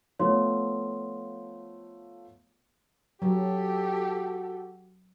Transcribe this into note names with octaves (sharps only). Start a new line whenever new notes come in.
F3 A3 B3 C#5 C6
F#3 F#4 G4 A4